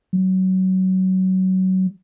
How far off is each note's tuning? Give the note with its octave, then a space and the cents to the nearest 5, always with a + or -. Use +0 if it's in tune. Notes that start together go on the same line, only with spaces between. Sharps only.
F#3 +20